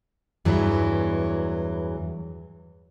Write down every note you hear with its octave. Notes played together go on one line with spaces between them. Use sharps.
E2 G2 E3 F#3